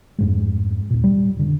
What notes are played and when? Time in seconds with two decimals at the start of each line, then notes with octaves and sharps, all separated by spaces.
0.19 F2 G#2 G#3
0.90 D#2 A#2
1.04 G3
1.37 F1 D3